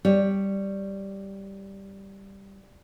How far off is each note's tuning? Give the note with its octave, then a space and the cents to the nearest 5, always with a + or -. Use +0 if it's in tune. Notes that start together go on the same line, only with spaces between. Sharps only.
G3 +0 C#5 +0